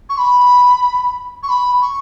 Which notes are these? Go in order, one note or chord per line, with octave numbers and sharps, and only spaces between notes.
C#6
B5
C#6
B5
C#6